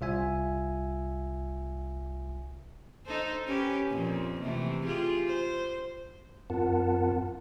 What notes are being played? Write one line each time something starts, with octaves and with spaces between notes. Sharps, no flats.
C2 F4 E5 G#5
D#4 A4 C5
C#4 G4 B4
F2 A#2 A#3
C3 E3 A3
F4 G4 G#4
C5
F#2 C4 F4 A#4 F#5 A5